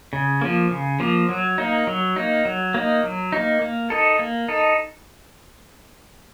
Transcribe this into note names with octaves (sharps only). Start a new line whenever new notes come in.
C#3
F3 A#3
C#3
F3 A#3
F#3
A#3 D#4
F#3
A#3 D#4
F#3
A#3 D#4
F#3
A#3 D#4
A#3
D#4 A4
A#3
D#4 A4